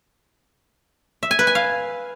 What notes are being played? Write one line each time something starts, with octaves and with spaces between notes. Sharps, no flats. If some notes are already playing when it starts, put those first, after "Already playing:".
E5
G#5
B4
G#5
F5